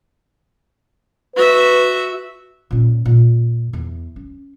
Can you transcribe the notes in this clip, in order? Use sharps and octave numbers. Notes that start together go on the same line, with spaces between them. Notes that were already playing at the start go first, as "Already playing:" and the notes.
F#4 B4 E5
A#2 C#4
A#2
E2
C#4